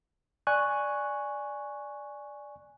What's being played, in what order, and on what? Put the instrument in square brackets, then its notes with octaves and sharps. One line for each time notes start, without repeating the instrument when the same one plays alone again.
[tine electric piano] D5 G#5 C#6 F#6